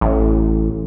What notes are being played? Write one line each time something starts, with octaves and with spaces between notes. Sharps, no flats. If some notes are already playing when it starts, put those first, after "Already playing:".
A1